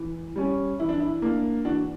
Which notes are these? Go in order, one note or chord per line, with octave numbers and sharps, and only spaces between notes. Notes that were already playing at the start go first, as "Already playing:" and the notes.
Already playing: E3
G3 C#4
E3 E4
D4
E4
A#3 D4
E3 D4 F#4